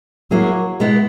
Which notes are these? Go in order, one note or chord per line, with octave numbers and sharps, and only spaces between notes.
F#3 A#3 E4 G#4
B2 G#3 B3 E4